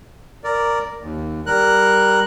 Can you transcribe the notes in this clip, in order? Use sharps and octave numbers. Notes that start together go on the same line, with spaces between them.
A#4 D5
D#2
G3 A#4 F#6